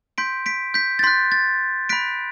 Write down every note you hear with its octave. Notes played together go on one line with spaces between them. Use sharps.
C6 G6 B6 D7
B6 D7
G6 B6
A6
C6 F#6 G6 B6
A6
B5 F#6 B6 D7